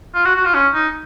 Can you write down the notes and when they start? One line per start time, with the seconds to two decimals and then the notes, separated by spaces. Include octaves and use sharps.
0.15 F4
0.25 F#4
0.35 F#4
0.45 F4
0.54 C#4
0.74 D#4